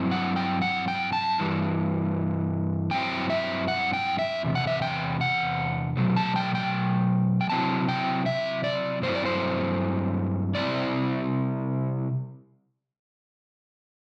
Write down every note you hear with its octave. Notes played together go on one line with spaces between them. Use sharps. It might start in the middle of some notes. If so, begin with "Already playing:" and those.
Already playing: G2 F#3 C4 E4
F#5
G5
F#5
G5
A5
G2 E3 G3
G2 F#3 C4 E4 G5
E5
F#5
G5
E5
E2 C3
F#5
E5
G5
F#5
B2 F#3 A3
A5
G5
G5
G5
C3 F#3 C4 E4 A5
G5
E5
D5
G2 F#3 A3 C4 E4 C5
D5
C5
C3 G3 C4 E4 D5